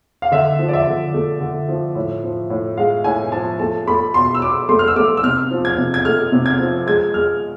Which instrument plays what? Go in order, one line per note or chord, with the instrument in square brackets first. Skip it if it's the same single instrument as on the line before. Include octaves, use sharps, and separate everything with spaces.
[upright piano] F5
D3 E5
F3
D5
E5
D3
A3
D3
F3
A2
F3
A2
G#3 F5
A2 G#5
F3 A5
A3 A5
A3 B5
B2 C6
E6
B2 D6
A3 C6
F6
E6
A3 D6
E6
C3 F6
F3
G#6
C3
G#6
A3 F6
C3
G#6
F3
G#3 G#6
G#3 F6